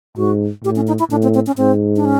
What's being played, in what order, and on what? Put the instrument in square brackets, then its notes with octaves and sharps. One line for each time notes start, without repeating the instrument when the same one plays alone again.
[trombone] G#2 [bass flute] F#4
[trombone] A2 [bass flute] G4
[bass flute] C#4
D#4
E4
[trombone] A2 [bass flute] D4
[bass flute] C4
C4
C#4
[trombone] G#2 [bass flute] C4
[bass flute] D4
C#4